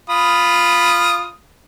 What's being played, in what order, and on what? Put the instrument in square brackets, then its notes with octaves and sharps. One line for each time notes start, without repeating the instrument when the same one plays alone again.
[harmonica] F4 B5 D#6